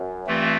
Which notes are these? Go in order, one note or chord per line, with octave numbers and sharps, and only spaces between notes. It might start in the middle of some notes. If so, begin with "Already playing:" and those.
Already playing: F#2
G2 E3 A3 C4 F4